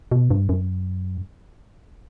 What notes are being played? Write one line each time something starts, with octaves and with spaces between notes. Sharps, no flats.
B2
G2
F#2